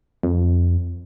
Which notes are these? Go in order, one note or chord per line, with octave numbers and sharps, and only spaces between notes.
F2